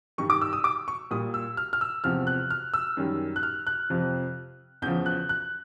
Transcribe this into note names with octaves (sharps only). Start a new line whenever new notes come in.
G2 D#3 G3 C#6
D6
E6
D#6
D6
C#6
A#2 G3 D#6
E6
F6
F6
E6
E2 C3 F3 F6
F#6
F6
E6
F#2 D#3 G3
F#6
F6
F#6
F2 C3 F3
E2 C#3 F3 G6
F#6
F#6